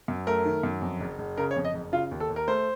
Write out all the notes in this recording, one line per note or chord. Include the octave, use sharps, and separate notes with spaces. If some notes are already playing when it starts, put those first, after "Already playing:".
F#2
A3 A#4
D#3
F#2
F2
F#1
F#1
C#3 A#4
C#5
F2
D#5
F#1
C#3 F4
D#2
A4
D#2
A#4
A3 C5